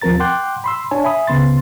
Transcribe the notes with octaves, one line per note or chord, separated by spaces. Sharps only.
D#2 F3 C4 A#4 A#5 A6
F#5 G5 C6 D6 F#6 G6
B5 C6 E6
D4 C#5 G#5 A5
E5 G#5 B5 D#6
C#2 C#3 B3 C6 A6